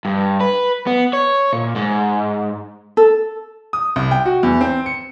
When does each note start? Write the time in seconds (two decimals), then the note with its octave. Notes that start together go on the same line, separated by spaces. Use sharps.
0.05 G2
0.40 B4
0.87 B3
1.13 C#5
1.53 A#2
1.75 G#2
2.97 A4
3.73 D#6
3.96 C2
4.11 G5
4.25 F#4
4.43 E2
4.61 C4
4.86 C#7